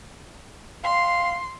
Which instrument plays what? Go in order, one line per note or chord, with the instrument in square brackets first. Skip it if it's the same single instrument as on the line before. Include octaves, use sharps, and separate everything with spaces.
[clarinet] F5 [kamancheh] C6